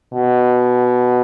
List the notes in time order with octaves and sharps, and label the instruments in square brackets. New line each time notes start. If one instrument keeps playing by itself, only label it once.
[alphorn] B2